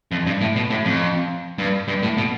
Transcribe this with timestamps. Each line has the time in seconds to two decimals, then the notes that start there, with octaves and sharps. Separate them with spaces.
0.12 F2
0.26 G2
0.41 A2
0.56 B2
0.70 A2
0.85 F2
1.58 G2
1.88 G2
2.03 A2
2.17 B2